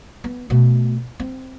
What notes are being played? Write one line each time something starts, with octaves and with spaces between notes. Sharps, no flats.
B3
B2 A3
C4